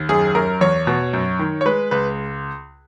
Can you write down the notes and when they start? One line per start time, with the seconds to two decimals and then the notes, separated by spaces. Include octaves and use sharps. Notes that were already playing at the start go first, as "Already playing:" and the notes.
Already playing: D#2
0.09 F#2 G#4
0.35 F#2 A#4
0.61 E2 C#5
0.87 B2
1.13 F#2
1.39 D#3
1.61 C#5
1.65 G#3 B4
1.91 C#2 B4